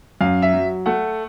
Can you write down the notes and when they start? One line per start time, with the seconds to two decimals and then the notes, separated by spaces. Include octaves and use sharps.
0.21 F#2 F5
0.42 E5
0.53 F#3
0.86 A3 F#5